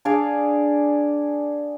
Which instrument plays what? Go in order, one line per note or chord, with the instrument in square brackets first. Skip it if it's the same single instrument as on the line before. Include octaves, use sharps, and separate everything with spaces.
[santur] D4 G#4 D5 F5